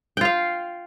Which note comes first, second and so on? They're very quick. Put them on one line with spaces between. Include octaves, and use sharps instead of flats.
G5 F4 F5